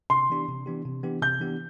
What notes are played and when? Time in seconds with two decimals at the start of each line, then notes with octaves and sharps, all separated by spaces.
0.10 C3 C6
0.30 E3 B3 D4 G4
0.48 C3
0.66 E3 B3 D4 G4
0.85 C3
1.03 E3 B3 D4 G4
1.22 C3 G6
1.40 E3 B3 D4 G4